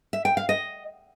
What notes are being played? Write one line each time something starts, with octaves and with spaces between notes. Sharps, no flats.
E5
G5
F5
D#5